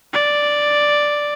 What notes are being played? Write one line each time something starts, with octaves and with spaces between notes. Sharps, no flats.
D5